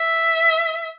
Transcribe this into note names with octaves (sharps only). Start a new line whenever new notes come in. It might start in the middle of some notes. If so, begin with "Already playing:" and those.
Already playing: E5